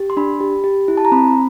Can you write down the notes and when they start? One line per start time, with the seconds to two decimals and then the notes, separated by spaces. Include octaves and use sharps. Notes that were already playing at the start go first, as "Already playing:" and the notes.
Already playing: G4
0.10 C6
0.17 D4 B5
0.40 G4
0.64 G4
0.88 E4
0.97 A5
1.05 A#5
1.12 C4 B5